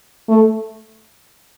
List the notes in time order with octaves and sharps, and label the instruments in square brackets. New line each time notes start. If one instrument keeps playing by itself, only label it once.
[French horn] A3